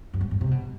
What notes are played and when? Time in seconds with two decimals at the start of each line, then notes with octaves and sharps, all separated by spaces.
0.14 F#2
0.21 G2
0.31 G2
0.41 C3
0.51 B2